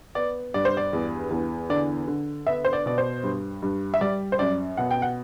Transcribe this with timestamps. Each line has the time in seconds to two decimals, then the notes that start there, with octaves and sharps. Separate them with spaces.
0.15 B3 D5
0.54 G2 D5
0.65 C5
0.77 D5
0.93 E2
1.31 E2
1.70 D3 D5
2.08 D3
2.47 B3 E5
2.65 C5
2.73 D5
2.86 B2 D5
2.98 C5
3.23 G2
3.62 G2
3.94 E5
4.01 G3 D5
4.32 C5
4.39 F#2 D5
4.77 B2 F#5
4.91 G5
5.02 F#5